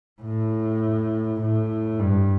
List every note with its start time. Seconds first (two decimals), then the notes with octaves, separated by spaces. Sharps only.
0.22 A2
1.41 A2
2.00 G2